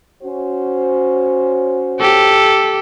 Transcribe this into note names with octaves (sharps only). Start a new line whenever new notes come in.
C#4 F#4 C5
G4 A4